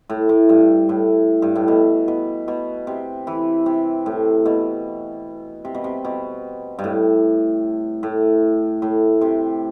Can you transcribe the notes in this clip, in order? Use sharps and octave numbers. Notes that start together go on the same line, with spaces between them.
A2
A2
G2
A2
G2
A2
B2
B2
B2
C3
E3
C3
A2
B2
C3
B2
C3
B2
G2
A2
A2
A2
C3